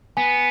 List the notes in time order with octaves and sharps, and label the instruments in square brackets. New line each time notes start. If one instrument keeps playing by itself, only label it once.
[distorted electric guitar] B3 [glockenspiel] G#5